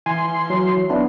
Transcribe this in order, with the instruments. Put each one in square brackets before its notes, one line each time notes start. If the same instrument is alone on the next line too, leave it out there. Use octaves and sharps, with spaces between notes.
[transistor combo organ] E3 C6 [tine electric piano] G#5
[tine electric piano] F#3
B3 D4 E4